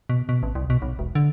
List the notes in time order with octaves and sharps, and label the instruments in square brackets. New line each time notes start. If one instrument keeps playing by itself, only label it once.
[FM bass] B2
B2
A1
C2
B2
B1
E1
D3